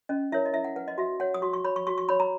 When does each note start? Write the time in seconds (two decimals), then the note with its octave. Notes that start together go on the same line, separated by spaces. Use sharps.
0.09 C#4 D#5
0.32 E4 A#4 C#5 E5
0.45 D#5
0.54 E4 E5
0.64 F#5
0.76 B4 F#5
0.88 D#5
0.98 F#4 E5
1.20 C#5 F#5
1.34 D#6
1.42 F#4 C#6
1.53 C#6
1.65 C#5 B5
1.76 C#6
1.87 F#4 C#6
1.98 C#6
2.09 C#5 B5
2.20 A#5